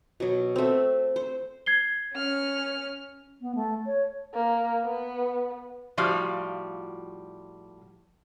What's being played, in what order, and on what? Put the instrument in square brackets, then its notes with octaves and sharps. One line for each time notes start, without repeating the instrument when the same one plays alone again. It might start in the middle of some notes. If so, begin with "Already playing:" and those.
[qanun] B2 F#3
A3 C4
C5
[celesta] G#6 C7 G7
[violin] C#4 F6
[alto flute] B3
A3
C#5
[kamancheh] A#3
B3
[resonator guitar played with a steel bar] A2 F3 G3 F4 F#4